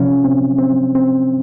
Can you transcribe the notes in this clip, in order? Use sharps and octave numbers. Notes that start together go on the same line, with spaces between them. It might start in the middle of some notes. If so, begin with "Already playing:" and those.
Already playing: C3 F3 C#4
C4
C4
C4